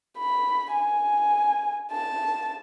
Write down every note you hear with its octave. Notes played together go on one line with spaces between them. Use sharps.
B5
G#5
A5